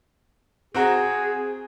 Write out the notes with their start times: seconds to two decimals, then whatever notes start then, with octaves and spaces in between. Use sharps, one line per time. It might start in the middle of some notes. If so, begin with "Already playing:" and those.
0.74 C4 F#4 G#4 A#5